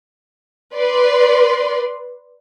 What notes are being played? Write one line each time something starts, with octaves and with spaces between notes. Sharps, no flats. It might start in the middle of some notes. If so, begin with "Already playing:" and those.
B4 D5 C6